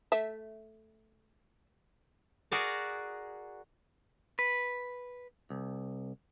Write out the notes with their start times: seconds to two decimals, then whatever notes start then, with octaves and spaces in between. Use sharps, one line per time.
0.12 A3 E5
2.52 F#4 G#4 A#4 D5
4.39 B4
5.50 C2